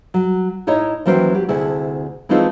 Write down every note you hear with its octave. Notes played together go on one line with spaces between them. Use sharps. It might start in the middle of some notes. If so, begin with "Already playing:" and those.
F#3
A2 D#4 E4 C#5 D#5
D#2 E3 F#3 C#4 C5 G5
F#3 G4
D2 C3 E4 G#4
E3 G#3 A3 C4 D#4 F4